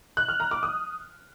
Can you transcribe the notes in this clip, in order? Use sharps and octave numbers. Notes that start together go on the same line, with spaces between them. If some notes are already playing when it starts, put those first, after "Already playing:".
F#6
F6
A#5
D6
D#6